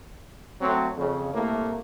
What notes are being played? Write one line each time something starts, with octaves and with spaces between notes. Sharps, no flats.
F#3 A3 C4
F2 C#3
C2 A2 A3 A#3